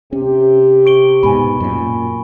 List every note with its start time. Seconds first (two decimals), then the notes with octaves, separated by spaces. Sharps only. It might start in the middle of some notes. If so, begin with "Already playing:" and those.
0.13 C3 C#4 G4
0.86 C#6 D7 G7
1.23 G#2 B2 G#5 B5
1.60 F#2 A#2